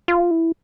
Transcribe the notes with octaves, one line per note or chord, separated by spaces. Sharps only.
F4
E4